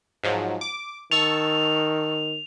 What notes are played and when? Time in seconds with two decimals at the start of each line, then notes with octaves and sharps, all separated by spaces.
0.23 G#2 F3 F#3
0.61 D6
1.11 D#3 A5 C#6 E6 F7